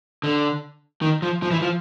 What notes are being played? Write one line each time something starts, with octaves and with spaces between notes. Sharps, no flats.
D3
D#3
F3
F3
E3
F3